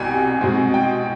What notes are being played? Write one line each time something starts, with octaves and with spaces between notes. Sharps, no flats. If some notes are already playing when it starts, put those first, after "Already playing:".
Already playing: C2 B2 G3 G5 G#5
B2 G#3 C4 D#4
G5